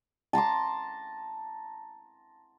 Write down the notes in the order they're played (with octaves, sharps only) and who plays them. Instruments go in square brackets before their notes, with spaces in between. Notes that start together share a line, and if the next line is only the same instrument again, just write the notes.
[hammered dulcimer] A5 A#5 C6 D6